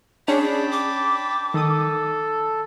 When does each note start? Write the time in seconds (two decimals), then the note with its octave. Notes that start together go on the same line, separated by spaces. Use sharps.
0.28 C#4 D4 G#4 C#5 G5 A5 B5
0.71 D6
1.54 D#3 A4 D#6